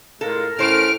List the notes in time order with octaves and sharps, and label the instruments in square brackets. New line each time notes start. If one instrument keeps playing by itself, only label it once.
[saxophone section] A2 G#3 F4 [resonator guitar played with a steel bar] A4 [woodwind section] A#4
[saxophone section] A2 C#4 [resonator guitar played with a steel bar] A4 C5 [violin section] F6 D7